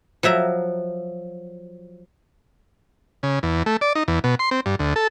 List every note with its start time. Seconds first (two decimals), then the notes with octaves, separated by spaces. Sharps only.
0.23 F3 F#3 E5 A#5
3.23 C#3
3.43 E2
3.66 A3
3.81 D5
3.95 D#4
4.08 E2
4.24 B2
4.39 C6
4.51 C4
4.66 G2
4.79 D2
4.96 A4